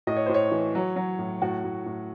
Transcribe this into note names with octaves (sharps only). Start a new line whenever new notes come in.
A2 D#5
C#5
A2 C5
C#5
E3
F#3
F#3
A2
A2 F#4
A2
A2